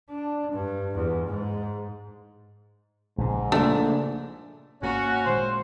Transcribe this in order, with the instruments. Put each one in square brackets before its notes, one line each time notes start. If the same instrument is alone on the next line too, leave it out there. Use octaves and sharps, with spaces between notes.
[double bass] D4
G2
E2
G#2
[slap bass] A#1 C#3 [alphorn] G#2
[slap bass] C#3 F3 [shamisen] A3 [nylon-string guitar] A#3 D4
[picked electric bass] G#1 G#2 A#3 [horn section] C#4 F#4
[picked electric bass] A#2 D#3 G#3 [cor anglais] C5